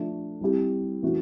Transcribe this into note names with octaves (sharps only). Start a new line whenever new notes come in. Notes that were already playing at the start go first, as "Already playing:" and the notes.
Already playing: F3 A3 D4
G3 C4 E4 G4
E3 A3 C#4 F#4